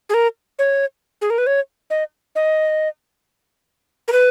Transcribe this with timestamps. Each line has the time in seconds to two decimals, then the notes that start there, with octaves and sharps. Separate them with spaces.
0.09 G#4
0.14 A#4
0.59 C#5
1.21 G#4
1.30 A#4
1.38 B4
1.47 C#5
1.90 D#5
2.35 D#5
4.08 A#4
4.12 B4